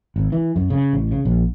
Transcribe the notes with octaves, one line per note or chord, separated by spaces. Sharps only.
G#1
E3
F#2
C#3
A1
C#3
A#1